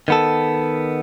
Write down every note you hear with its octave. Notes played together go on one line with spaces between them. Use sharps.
D#3 B3 A4